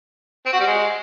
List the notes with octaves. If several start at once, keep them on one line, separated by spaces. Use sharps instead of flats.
C4
F#4
G3
G#3